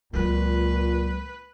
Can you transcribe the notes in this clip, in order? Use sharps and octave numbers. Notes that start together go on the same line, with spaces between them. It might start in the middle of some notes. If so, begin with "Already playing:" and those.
C#2 A#2 F#3 G#3 B4